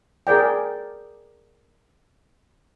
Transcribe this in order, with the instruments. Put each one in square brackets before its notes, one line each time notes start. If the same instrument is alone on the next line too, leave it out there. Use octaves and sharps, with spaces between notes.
[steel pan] G#4 A#4 D5 G5